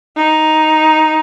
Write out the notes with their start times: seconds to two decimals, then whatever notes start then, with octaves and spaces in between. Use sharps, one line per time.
0.16 D#4